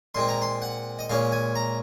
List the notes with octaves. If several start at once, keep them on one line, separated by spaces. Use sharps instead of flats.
A#2 G#3 C4 C6
A#5
C6
F#5
D#5
A#2 G#3 C#4 F5
G#5
A#5